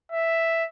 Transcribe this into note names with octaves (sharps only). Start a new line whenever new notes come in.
E5